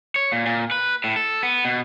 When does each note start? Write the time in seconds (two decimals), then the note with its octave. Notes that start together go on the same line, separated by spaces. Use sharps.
0.16 C#5
0.32 A#2
0.46 A#2
0.71 B4
1.04 A2
1.16 A4
1.43 B3
1.65 B2